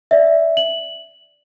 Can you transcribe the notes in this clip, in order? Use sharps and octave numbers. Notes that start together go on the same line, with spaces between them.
D5 E5
F#7